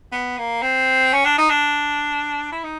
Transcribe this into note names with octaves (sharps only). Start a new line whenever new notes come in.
B3
A#3
C4
C#4
D4
D#4
D4
E4
D#4